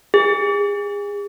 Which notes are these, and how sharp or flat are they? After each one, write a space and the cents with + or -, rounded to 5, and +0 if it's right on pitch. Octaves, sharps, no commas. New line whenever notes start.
G#4 -35